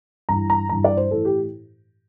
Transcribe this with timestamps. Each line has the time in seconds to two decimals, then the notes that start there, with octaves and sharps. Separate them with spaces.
0.29 G2 E3 A#5
0.50 A#5
0.69 G2 E3 A#5
0.84 D5
0.97 C5
1.11 A2 E3 A4
1.25 G4